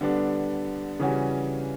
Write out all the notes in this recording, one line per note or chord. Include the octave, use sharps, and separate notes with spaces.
D3 G3 B3 D4
C#3 E3 G3 C#4 F#4